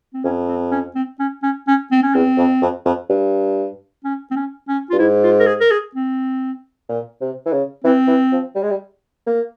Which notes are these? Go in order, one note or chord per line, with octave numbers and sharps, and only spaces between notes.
C4
F2 C#4
C4
C#4
C4
C#4
C#4
C#4
C4
C#4
E2 C4
F2
F2
F2
G2
C#4
C4
C#4
C#4
G2 F4
G#2 E4
F4
A#4
G#4
A#4
G#4
C4
A#2
C3
E3
C#3
E3 C4
E3
F3
G3
G#3
G3
A#3